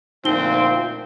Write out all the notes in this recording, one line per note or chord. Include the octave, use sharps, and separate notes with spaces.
D2 A#2 F3 C4 D#4 G7